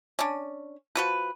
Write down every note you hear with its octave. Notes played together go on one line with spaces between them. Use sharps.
C#4 D4
F3 F#4 B4